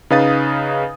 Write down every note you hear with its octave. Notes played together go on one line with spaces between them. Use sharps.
C#3 D#4 B4 F5 D#6 A6